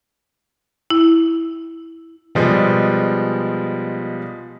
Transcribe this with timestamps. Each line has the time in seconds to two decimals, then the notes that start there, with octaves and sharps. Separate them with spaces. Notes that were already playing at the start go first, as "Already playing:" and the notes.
0.90 E4
2.35 B2 F3 G3 G#3